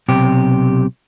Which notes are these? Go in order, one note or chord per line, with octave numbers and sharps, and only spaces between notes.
B1 C3 G4